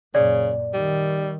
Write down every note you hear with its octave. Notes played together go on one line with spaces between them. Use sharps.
F#2 A#2 C#3 D5
D#3 G3